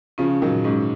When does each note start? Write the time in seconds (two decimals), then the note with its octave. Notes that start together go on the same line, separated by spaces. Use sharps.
0.18 C#3 F3 C#4
0.42 A#2 D#3 F#3
0.64 G#2 C#4